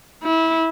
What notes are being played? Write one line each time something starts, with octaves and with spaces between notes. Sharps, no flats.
E4